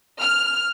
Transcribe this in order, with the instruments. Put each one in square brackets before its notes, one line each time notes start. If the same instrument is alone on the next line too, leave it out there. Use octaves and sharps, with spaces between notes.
[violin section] F6